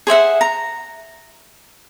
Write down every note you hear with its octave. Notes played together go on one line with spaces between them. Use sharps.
G#4 C5 E5 F#5
A#5